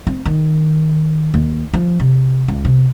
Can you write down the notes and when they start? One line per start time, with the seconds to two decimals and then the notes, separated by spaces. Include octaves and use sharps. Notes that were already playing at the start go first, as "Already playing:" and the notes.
0.07 C4
0.25 D#3
1.34 D#2
1.73 F3
2.00 C3
2.48 C#2
2.65 C3